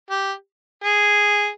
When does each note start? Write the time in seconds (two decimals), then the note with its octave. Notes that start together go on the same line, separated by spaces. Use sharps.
0.10 G4
0.83 G#4